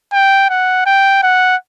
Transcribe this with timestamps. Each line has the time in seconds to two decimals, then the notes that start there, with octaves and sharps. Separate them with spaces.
0.13 G5
0.49 F#5
0.86 G5
1.23 F#5